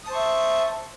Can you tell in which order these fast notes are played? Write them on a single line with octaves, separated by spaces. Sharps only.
D#6 A5 C5 C#6 E5